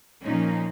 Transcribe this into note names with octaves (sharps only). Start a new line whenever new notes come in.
A#2 F3 A#3 C#4 D#4